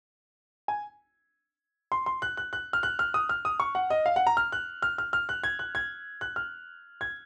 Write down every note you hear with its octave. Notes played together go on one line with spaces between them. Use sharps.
G#5
C6
C6
F#6
F#6
F#6
F6
F#6
F6
D#6
F6
D#6
C#6
F#5
D#5
F5
F#5
A#5
F6
F#6
F6
F6
F6
F#6
G#6
F#6
G#6
F#6
F6
G#6